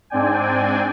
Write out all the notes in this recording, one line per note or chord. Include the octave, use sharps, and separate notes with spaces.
G#2 C4 D4 D5 G5 G#5